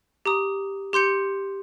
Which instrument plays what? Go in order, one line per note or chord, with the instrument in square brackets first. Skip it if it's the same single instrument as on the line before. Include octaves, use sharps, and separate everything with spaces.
[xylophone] G4 A#5 D#6
G4 C6 G6 C#7